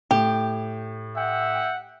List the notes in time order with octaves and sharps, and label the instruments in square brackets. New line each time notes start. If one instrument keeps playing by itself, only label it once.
[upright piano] A2 [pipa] G4
[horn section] E5 F#5 G5